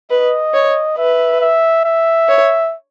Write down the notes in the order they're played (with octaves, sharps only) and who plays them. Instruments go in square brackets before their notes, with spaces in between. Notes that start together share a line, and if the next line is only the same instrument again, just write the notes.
[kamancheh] B4 [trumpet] D#5
[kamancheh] C#5
[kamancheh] B4 [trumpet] E5
[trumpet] E5
E5
[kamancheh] C#5